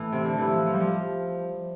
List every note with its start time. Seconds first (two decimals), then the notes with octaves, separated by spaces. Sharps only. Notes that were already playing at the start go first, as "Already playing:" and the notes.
Already playing: A2 E3
0.12 C3
0.25 D3
0.38 E3
0.51 F3
0.67 F3
0.74 G3
0.80 F3